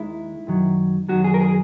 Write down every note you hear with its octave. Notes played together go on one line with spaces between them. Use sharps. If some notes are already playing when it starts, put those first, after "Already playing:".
Already playing: D#2 D#3 G#3 E4
F#2 D#3 F#3
F#2 D#3 F#3 F#4
G#4
A#4
G#4